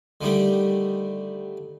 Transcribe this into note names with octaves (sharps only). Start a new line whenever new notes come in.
D3 D#3 G3 A3